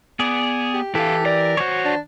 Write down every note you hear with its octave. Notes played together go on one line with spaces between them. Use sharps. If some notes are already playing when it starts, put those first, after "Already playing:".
B3 G#4 D5
G4
E3 E4 G4 A4 F5
A#4 D5
E3 F#4 C5 C#5
D4